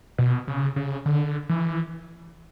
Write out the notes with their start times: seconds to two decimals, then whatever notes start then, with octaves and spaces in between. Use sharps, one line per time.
0.18 B2
0.48 C#3
0.76 C#3
1.06 D3
1.49 E3